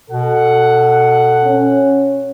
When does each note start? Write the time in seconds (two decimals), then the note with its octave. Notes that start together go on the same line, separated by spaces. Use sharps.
0.11 B2 A4 F#5
1.44 C#4